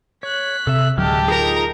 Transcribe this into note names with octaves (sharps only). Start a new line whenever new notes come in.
C#5 F#6 B6
C3 A4 E5
D1 D3 F#3 G#3 G4 A5 F6
D#4 F4 G#4 A#4 A#5